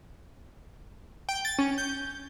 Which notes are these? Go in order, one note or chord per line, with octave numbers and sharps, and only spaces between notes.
G5
A6
C#4
G6